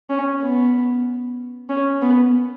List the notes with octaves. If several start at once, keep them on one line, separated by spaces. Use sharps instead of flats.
C#4
B3
C#4
B3